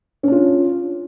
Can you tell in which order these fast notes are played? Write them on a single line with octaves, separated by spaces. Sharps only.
C#4 D4 F4